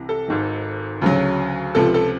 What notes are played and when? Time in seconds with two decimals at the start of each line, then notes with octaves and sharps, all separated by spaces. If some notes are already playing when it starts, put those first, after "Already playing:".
Already playing: C2 C3 E3
0.09 A4
0.28 G#1 G#2 D#3
1.02 D2 C#3 F#3
1.75 C#2 C3 F3 A4
1.94 A4